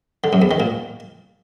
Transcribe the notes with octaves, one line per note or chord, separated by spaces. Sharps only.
D3
F#2
E2
D#3
A#2